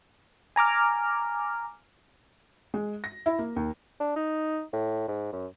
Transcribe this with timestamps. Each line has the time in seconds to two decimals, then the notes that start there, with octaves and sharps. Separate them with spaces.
0.56 G#5 A#5 D6 F6
2.74 G#3
3.04 A#6
3.26 E4
3.39 A#3
3.56 D#2
4.00 D4
4.16 D#4
4.73 A2
5.08 G#2
5.33 F#2